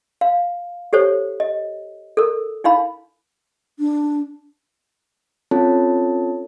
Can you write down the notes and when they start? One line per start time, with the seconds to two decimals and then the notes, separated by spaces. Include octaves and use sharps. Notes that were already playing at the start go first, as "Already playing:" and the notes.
0.21 F5
0.93 G4 A4 C5 C#5
1.40 D#5
2.17 A4 A#4
2.64 D#4 E4 F5 B5
3.79 D4
5.51 C4 C#4 F4 A4 C#5 A5